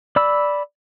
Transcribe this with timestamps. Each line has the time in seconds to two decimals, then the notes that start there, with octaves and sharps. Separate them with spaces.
0.16 D5 B5 E6